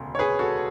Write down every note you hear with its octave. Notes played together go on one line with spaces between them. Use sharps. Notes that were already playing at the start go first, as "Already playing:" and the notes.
Already playing: E1 D2 C#3
C#5
G#4 B4
F#4 A4